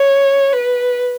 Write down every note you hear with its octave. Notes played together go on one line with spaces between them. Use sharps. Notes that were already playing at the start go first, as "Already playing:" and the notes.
Already playing: C#5
B4